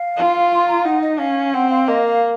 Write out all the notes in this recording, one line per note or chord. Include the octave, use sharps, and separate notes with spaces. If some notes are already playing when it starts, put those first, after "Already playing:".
Already playing: F5
F4
C6
A#5
D#4 F#5
D#5
C#4 F5
C4 F#5
F5
A#3 D#5
F5